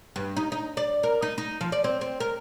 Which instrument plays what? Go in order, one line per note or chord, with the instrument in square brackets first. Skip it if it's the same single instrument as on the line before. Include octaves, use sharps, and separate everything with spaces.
[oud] G2
D#4
D#4
D5
A#4
D#4
D#4
F3
D5
C4
C4
A#4